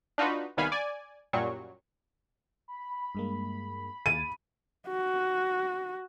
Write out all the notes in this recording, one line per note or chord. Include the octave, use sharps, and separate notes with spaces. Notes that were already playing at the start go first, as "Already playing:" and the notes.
D4 D#4 F4 F#4 B4
C2 D#3 B3 F5 G#5 B5
D5 G#5
F#2 A#2 F#3 G3 C#6
B5
G2 G#3 A#3
D#2 G#5 A6 D#7
F#4